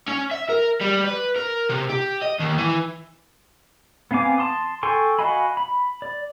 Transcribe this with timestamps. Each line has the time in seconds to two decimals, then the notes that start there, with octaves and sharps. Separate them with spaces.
0.09 C#4
0.31 E5
0.49 A#4
0.81 G3
1.04 B4
1.36 A#4
1.70 C3
1.90 G4
2.23 D#5
2.40 D#2
2.58 E3
4.11 B3 C4 F5 G#5 D6
4.38 A5 C6 D#6
4.83 A4 G5 G#5 C6 C#6
5.19 F#4 D#5 F5 G#5 B5
5.57 B5
6.02 D5